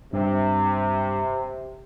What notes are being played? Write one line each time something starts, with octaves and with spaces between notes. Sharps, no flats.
G2 C3